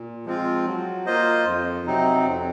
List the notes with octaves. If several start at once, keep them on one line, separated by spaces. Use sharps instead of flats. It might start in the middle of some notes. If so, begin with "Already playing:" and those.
Already playing: A#2
F3 G#3 C4 F4
F#3
A#3 F4 C5 D#5
F2
C3 F#3 C4 D#4
F2